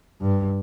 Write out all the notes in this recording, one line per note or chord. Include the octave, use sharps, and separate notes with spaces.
G2